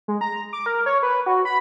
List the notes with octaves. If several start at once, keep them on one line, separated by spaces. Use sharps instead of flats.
G#3
A#5
D6
A#4
C#5
B4
F#4
B5